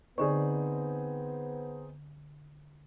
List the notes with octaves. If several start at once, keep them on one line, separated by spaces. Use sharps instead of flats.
D3 B3 C4 D#4 G#4 D5 C#6